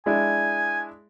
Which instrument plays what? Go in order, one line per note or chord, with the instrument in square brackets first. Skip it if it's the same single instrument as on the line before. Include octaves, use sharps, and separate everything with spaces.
[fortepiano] G#3 D4 E4 [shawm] G#5